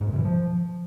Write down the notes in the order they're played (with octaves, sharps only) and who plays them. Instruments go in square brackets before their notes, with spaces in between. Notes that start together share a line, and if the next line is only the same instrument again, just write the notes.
[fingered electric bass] G#2
A#2
C3
E3
F3